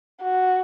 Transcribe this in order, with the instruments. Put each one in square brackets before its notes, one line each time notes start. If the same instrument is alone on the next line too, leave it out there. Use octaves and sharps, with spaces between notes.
[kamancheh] F#4